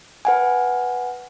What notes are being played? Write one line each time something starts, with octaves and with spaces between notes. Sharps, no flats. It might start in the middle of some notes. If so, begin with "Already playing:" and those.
B4 F#5 G#5